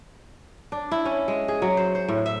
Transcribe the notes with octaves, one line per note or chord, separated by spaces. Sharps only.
D4
E4
C#4
G#3
G#4
F#3
C5
C5
A2
E5